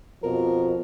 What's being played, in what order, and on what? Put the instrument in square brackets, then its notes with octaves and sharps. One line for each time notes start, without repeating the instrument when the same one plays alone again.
[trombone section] F2 B2 F3 [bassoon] A#4